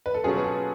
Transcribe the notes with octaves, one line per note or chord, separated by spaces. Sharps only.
B4
A4
B2 F#3 A3 C#4 F4 G#4
B4
A4